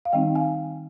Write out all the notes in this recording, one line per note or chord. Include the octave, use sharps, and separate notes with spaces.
F5
D#3 G3 C4 D#4 D#5 G5
F5 G#5